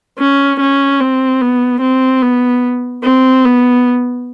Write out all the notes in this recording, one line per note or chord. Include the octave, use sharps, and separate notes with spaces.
C#4
C#4
C4
B3
C4
B3
C4
B3